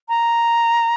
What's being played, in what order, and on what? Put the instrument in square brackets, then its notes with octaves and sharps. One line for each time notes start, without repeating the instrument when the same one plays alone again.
[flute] A#5